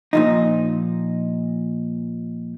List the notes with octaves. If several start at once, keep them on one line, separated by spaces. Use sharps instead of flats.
A#2 F3 D#4